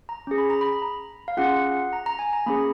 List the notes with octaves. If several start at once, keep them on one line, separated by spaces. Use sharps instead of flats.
A#5
C#4 G#4
B5
A#5
B5
A#5
F5
C#4 F4 G#4 F#5
A#5
A#5
G#5
A#5
A#3 C#4 G#4 B5